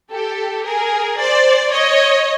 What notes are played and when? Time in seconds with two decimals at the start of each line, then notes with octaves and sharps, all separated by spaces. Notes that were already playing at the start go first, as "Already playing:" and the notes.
0.11 G4 A4
0.65 G#4 A#4
1.19 C5 D5
1.72 C#5 D#5